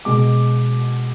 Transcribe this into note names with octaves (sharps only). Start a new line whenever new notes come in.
B2 G#3 D6